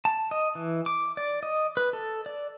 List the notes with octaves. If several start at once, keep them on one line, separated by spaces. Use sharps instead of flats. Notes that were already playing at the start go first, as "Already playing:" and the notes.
A5
D#5
E3
D6
D5
D#5
B4
A4
D5